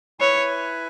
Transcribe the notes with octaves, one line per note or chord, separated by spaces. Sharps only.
E4 B4 C#5 E5 G#5